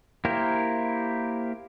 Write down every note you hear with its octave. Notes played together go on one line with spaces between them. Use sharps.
A#3 E4 G4 A#4 C5